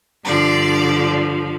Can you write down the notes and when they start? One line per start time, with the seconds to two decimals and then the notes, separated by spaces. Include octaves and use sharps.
0.24 G2 D3 F3 D5